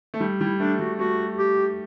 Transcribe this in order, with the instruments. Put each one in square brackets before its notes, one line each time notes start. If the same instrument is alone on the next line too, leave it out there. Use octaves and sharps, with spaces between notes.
[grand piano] A3
G3
[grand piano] G3 [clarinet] E4
[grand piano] A3 [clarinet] D4
[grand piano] G3 [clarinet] F#4
[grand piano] A3 [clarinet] F#4
[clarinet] G4